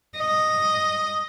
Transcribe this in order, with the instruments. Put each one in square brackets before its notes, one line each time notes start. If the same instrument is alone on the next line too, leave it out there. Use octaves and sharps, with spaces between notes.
[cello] D#5